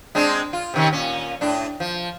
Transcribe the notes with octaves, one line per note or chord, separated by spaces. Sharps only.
G#3 C4 D4
F4
C3 D#3 C#4
A#2 C#4
A2 D4
F3